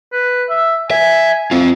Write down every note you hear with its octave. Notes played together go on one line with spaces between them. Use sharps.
B4
E5
E5 G#5
C4 F4